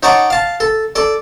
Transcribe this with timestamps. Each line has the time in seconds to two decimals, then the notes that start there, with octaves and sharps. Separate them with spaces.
0.03 D#4 C#5 F#5 A5 D6
0.30 F5 A5
0.60 A4
0.95 A4 D5